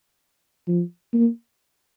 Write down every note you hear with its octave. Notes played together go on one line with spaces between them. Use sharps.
F3
A#3